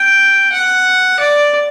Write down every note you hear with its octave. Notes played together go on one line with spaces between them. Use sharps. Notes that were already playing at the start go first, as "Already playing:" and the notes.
Already playing: G5
F#5
D5